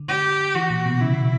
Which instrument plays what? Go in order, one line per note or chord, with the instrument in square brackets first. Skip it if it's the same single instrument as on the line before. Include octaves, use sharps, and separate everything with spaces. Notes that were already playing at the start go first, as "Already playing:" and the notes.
Already playing: [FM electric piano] D3
[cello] G4
[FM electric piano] E3 [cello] F#4
[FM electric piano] A#2
B2
[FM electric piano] C#3 [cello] E4
[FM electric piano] B2